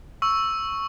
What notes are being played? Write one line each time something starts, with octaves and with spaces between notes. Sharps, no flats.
C#6 E6